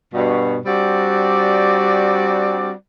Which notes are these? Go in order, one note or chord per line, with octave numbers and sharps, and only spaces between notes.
G2 B2
G3 C4 D4 F#4 D5